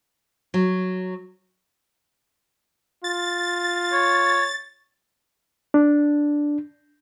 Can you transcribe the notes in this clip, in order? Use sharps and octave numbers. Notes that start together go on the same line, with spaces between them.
F#3
F4 A6
C#5
D4